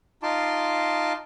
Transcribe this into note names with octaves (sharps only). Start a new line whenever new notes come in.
D#4 F4 A5 C6 D6